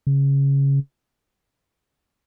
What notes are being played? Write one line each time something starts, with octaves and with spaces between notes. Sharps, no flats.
C#3